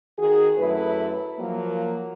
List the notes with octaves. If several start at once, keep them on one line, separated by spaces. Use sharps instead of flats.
D#3 F#4 G#4
F#2 A3 E4 B4
F3 F#3 A#3